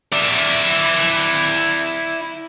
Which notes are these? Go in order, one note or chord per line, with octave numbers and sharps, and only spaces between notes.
E4 D5